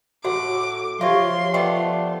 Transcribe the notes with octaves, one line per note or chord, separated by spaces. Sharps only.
A2 F#4 F#5 D6
F3 F4 G4 C#5 E5 F5 C6
A3 B3 D5 G5